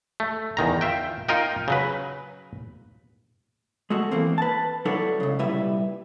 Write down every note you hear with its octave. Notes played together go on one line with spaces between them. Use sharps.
A3
E2 D#3 A#5
F4 E5 G5
D#4 F4 A#4 D#5 G5
C#3 F#3 B4
G#3 A3 F#4 A4
E3 A#3 C4
B4 A5
F#3 D4 E4 A4 C#5
C#2 C#3
C2 A#2 G3 E4 B4 E5